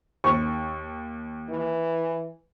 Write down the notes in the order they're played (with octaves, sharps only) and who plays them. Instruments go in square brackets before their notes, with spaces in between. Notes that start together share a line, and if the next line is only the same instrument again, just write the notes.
[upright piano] D#2 C#6
[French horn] E3